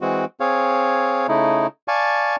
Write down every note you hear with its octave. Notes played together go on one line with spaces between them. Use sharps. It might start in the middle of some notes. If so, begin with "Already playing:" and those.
E3 G#3 C4 F#4
C4 G#4 C#5 F5
C#3 A3 D#4 E4
D5 F5 G#5 A5 C#6